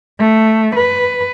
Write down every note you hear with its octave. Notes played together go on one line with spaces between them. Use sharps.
A3
B4